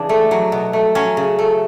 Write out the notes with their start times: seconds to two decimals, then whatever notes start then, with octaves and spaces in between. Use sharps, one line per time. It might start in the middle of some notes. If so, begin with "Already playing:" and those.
Already playing: C#3 E3 D4
0.09 A3
0.31 F#3
0.52 B2
0.73 A3
0.95 F#3 C#4
1.17 C#3
1.39 A3